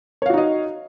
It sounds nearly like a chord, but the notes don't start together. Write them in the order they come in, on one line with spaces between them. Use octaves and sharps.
C#5 F5 F#4 D#4 D#5